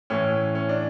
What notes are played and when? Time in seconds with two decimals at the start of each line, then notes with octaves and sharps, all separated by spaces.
0.10 A2 E3 C#4
0.55 C#4
0.69 D4